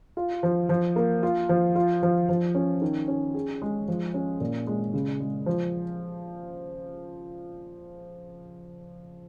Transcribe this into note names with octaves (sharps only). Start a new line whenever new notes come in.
F4
F3
F3
A#3
F4
F3
F4
F3
F3
C#4
D#3
C#4
G#4
G#3
F3
C#4
A#2
G#3
C#3
G#3
F3